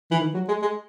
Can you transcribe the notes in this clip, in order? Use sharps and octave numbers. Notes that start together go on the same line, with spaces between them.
E3
D#3
F#3
G#3
G#3